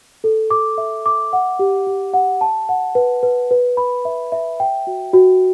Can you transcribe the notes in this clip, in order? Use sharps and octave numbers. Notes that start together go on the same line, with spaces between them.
A4
D6
E5
D6
F#5
G4
G4
F#5
A5
F#5
B4
B4
B4
B5
E5
E5
G5
F#4
F#4